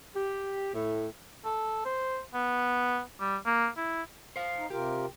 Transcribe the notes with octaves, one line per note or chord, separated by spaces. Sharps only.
G4
A2
A4
C5
B3
G3
A#3
E4
C5 F5
D#4
C3 F4 G4 A#4